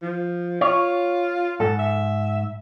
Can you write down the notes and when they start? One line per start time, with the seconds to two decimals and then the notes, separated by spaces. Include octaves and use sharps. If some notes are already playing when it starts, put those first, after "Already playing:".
0.02 F3
0.61 F4 C#5
1.60 G#2 A4
1.79 E5